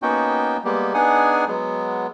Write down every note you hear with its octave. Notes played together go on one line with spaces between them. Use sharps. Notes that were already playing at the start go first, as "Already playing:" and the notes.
A#3 B3 C#4 D#4 F#4 G5
G3 G#3 A#3 B3 G4
B3 D4 D#4 G#4 F#5 G#5
F#3 G#3 B3